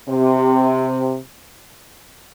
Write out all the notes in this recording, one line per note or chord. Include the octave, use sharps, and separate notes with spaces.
C3